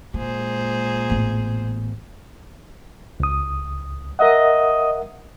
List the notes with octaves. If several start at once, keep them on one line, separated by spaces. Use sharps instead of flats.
A#2 G#3 G#4 C5
A1 B3
C#2 D#6
A#4 D#5 E5 F#5